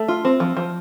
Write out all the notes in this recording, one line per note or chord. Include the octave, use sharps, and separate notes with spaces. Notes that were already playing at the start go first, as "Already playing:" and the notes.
Already playing: A3
F4
C4
F3
F3